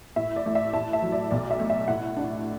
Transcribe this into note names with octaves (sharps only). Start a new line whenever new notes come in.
A2 E5
D5
A3
E5
A2 A5
E5
F#3
D5
B1 D5
E5
A3
E5
A2 F#5
D4